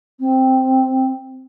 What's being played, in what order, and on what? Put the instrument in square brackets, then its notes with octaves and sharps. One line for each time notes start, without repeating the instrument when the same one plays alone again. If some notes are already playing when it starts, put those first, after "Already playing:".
[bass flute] C4